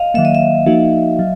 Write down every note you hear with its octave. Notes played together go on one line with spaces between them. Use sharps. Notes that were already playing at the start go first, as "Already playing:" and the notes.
Already playing: D#5 F5
D#3 F#3 A#3 E5
D#5
E5
F3 A#3 D#4 F#4
F#3